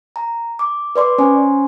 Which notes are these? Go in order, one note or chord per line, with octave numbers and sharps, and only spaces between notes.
A#5
D6
B4 D5 C6 D6
C#4 C5 C#5 G#5 C6